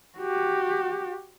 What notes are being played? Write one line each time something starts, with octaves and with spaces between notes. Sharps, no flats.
F#4 G4